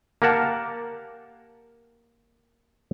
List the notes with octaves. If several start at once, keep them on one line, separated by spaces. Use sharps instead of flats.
A#3 G4 A#4 F#5 A5